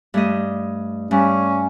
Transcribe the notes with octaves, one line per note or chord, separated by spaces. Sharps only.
G2 A3 D#5
G2 C#4